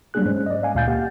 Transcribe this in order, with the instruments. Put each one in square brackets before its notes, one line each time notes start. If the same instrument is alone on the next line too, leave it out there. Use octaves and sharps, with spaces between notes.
[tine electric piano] F#3 G3 A#3 D4 G#4 F#6
G#2 G#3 C#4 C5
D5 D#5
F5 G#5
D2 A#2 F5 G#5 G6 A6
A#3 G4 F5 F#5